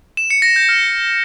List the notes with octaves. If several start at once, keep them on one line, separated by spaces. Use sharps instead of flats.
E7
C#7
A#6
G6
F6